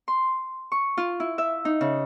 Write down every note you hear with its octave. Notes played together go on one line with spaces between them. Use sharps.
C6
C#6
F4
E4
E5
D#4
C#3